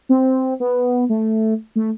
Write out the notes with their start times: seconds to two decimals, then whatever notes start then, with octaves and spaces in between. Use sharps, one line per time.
0.09 C4
0.60 B3
1.09 A3
1.76 A3